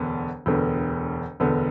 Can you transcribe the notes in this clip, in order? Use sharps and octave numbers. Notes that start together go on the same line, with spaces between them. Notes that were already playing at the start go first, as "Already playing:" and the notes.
Already playing: E1 D2 D3 B3
E1 D2 D3 B3
E1 D2 D3 B3